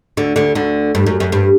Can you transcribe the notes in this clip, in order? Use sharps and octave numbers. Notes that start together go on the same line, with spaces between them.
D2 D3
D2 D3
D2 D3
G2
F#2
F#2
G2